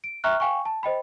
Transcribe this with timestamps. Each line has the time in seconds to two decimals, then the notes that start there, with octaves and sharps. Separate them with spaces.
0.04 D7
0.24 E5 G5 A#5 C#6 F6 F#6
0.40 F5 G5 G#5 C#6
0.65 A5
0.83 C5 D#5 G5 B5